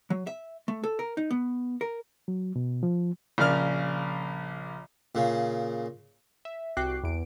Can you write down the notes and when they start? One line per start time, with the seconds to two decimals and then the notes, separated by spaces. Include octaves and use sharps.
0.10 F#3
0.27 E5
0.68 A3
0.84 A4
0.99 A#4
1.17 D#4
1.31 B3
1.81 A#4
2.28 F#3
2.56 B2
2.83 F3
3.38 A#1 C#3 A#4 D5 F6
5.15 A#2 C#3
6.45 E5
6.77 C2 F#4 G5 D6 F#6 C7
7.03 E2 D7